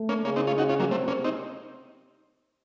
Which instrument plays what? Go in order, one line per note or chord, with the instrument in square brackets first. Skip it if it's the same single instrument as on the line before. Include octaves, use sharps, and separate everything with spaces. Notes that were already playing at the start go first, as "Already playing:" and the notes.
Already playing: [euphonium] A3
[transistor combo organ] A#3 C#4
[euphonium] C#3 [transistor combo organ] A#3 C#4
[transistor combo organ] C4 D#4
C#4 F4
D#4 F#4
C#4 F4
F#3 A#3
[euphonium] C3 [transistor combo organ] A3 C4
[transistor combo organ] A#3 C#4
C4 D#4